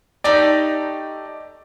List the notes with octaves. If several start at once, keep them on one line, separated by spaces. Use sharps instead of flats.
A3 D#4 G4 D5